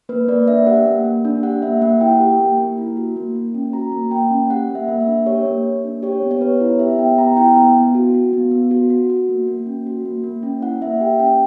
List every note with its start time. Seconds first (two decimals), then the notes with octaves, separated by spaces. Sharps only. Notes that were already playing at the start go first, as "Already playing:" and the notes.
0.09 A#3 B4
0.28 A#3 D5
0.48 D4 E5
0.67 G4 F#5
0.86 A#3
1.05 A#3
1.25 D4
1.43 G4 F#5
1.62 A#3 E5
1.81 A#3 F#5
2.01 E4 G5
2.20 G4
2.40 A#3
2.59 A#3
2.78 E4
2.97 F#4
3.16 A#3
3.36 A#3
3.54 C#4
3.73 F#4 A#5
3.92 A#3
4.11 A#3 G5
4.31 C#4
4.50 G4 F#5
4.69 A#3
4.75 E5
4.88 A#3
5.00 E5
5.07 D4
5.26 G4 C#5
5.45 A#3
5.65 A#3
5.84 D4
6.03 G4 C#5
6.22 B3
6.31 C#5
6.41 B3 B4
6.61 E4
6.79 G4 E5
6.98 B3 G5
7.18 B3 A#5
7.36 E4 G5
7.56 B3
7.75 B3
7.95 F#4
8.14 F#4
8.33 B3
8.51 B3
8.71 F#4
8.90 F#4
9.10 F#4
9.29 A#3
9.47 A#3
9.66 C#4
9.87 F#4
10.05 A#3
10.24 A#3
10.43 C#4
10.62 E4 F#5
10.82 A#3 E5
11.00 G4 G5
11.19 C#4 G5